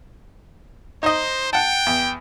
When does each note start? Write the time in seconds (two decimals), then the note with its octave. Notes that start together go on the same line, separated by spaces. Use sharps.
1.03 D#4 C5 D#5
1.53 F#5 G5 A5
1.86 E2